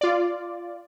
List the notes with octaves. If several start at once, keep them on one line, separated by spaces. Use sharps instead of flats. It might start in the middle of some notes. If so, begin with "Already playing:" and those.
F4 D5